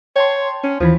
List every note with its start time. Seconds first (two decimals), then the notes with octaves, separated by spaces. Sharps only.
0.16 C#5 G5 A5 C6
0.64 C#4
0.80 D#2 E3 F3 B5